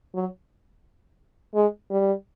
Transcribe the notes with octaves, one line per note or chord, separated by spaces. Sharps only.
F#3
G#3
G3